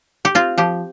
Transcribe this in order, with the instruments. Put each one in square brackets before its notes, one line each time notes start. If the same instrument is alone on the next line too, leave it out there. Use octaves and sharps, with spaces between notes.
[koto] G4
C4 F4
F3 G4